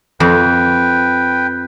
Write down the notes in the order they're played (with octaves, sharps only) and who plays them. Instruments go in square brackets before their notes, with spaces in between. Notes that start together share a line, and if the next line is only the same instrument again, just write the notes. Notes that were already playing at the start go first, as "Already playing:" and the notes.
[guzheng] F2 [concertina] B4 G5